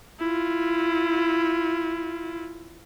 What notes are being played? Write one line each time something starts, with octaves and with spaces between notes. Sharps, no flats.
E4 F4